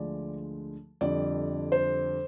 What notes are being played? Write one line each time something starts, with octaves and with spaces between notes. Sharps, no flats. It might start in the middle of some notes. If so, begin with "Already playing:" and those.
Already playing: D2 D3 F3 G#3 D5
F2 D3 G3 D5
C5